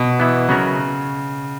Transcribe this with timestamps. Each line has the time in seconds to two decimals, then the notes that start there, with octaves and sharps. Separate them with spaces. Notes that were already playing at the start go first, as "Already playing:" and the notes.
Already playing: B2
0.19 E3 B3 E4
0.49 C#3 F#3 B3 F#4 A#4